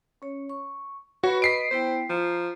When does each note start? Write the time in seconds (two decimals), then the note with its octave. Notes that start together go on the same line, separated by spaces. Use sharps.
0.22 C#4 C#5
0.49 C#6
1.24 F#4 B4 C#5 B5
1.42 D#5 B6 C7 D7
1.71 B3 E4 C5 G5
2.10 F3 A#5